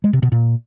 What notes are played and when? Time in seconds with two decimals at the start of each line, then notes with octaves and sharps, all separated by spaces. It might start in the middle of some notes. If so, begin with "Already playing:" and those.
0.04 G#3
0.13 C3
0.23 B2
0.32 A#2